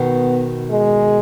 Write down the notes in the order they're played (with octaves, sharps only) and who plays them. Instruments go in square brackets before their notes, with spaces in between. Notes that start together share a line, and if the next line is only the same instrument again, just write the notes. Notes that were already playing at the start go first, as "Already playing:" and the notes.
Already playing: [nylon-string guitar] B2 D#3 [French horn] B3
[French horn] G#3